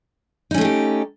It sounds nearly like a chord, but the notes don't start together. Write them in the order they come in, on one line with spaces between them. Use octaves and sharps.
D#4 C#4 A3 G#4 G4